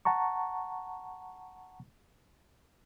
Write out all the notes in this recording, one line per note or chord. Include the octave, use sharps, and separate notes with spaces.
F#5 A5 A#5 C#6